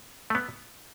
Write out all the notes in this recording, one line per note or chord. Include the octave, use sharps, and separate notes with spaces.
A3
B3